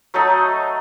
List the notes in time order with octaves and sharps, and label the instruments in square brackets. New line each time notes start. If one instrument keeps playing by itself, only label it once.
[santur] F#3 A3 D#4